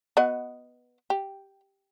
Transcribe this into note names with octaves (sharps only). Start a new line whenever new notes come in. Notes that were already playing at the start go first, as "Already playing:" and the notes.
B3 F#4 D#5
G4